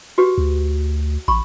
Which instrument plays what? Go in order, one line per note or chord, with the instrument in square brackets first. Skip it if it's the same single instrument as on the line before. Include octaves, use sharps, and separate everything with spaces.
[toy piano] F#4 G4 B4
[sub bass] D2
[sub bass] A1 [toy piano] B5 C#6